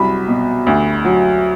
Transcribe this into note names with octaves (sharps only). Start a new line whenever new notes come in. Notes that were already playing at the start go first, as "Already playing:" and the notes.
Already playing: C2 F#3 B5
B2
D2
F#3